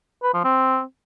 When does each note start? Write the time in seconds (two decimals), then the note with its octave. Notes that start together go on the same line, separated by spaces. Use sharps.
0.23 B4
0.34 F3
0.44 C4